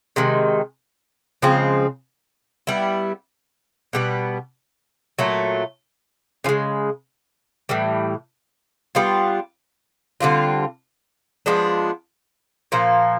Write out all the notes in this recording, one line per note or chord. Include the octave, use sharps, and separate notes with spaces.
C3 D#3 G#3
C#3 F3 G#3 C4
G3 B3 E4
B2 G3 B3
A#2 F#3 A3
C#3 F3 G#3
A2 E3 G3
G3 B3 D4 F4
D3 G3 C4 F4
F3 G#3 B3 D4
A#2 F3 A#3